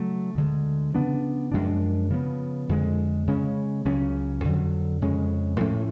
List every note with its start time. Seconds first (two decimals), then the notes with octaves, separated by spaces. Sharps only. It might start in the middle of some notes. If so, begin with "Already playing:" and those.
Already playing: C#3 F#3 A3
0.35 D2 D3 G#3
0.95 C#3 F3 B3 D4
1.52 F#2 F3 G#3 D4
2.10 C#3 F3 B3
2.69 F2 D3 G#3
3.27 C#3 G#3 C#4
3.85 C#2 C#3 F#3 C#4
4.44 F2 D3 F#3
5.02 F2 C#3 G#3 C#4
5.60 A2 F3 A3 C#4